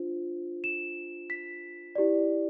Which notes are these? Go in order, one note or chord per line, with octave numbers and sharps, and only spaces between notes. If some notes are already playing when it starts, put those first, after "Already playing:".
Already playing: D4 F4 C5
E7
B6
E4 G4 D5